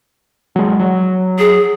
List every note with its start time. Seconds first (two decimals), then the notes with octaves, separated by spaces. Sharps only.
0.56 F#3 G#3
0.79 F#3
1.39 G#4